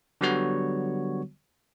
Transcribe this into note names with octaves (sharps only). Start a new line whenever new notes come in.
D3 F#3 G3 B3 F#4 C#5